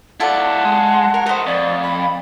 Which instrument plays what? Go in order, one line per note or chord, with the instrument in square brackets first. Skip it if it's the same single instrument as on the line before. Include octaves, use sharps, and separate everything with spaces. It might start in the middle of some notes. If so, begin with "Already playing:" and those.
[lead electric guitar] E4 D5 [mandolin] F4 A4 [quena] F#5
[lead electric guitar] G#3
[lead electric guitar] A#4 [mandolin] C#5
[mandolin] A3 D#5 [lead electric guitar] A#4 C5
[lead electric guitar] F2 [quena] D5
[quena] B5